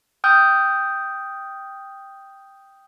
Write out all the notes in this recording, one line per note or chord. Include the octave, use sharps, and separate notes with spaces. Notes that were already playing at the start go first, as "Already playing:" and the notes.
G5 D#6 F6 G6